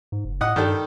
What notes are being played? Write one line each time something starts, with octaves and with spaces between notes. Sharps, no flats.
G#2
F#1
A2 D#5 F#5 D#6
G2 D#3 G3 A4